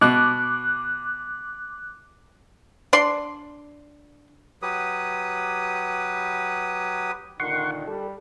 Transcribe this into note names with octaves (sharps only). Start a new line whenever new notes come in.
B2 D6 F#6
D4 D5 C6
F#3 G4 B4 D#6
A#2 D3 D#3 F#5 C6 C#6
G3 A4